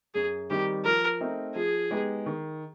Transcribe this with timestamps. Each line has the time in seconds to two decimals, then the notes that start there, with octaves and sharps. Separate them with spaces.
0.14 F#2 G#4
0.50 D#3 G3 C4 D#4 G4
0.85 F3 A#4
1.21 A3 C4 D#4
1.56 F3 G#4
1.91 G#3 B3 D#4 G4
2.26 D#3